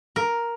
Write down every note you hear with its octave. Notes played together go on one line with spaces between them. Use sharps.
A#4